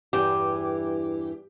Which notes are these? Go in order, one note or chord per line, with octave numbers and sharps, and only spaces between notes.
E2 G2 E3 G4